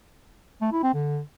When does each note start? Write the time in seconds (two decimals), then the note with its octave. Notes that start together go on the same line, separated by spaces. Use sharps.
0.62 A3
0.73 E4
0.83 C4
0.94 D3